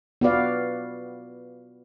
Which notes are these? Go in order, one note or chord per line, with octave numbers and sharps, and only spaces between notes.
B3 F4 F#4 B4 D5 F5